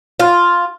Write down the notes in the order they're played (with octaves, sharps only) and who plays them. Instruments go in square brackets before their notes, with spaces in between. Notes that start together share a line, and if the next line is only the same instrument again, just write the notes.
[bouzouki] F4